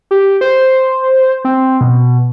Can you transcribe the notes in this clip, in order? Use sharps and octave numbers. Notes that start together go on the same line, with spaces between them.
G4
C5
C4
B2